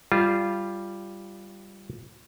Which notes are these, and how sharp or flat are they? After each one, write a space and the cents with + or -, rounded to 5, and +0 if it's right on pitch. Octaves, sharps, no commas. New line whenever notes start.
G3 +0 F4 -15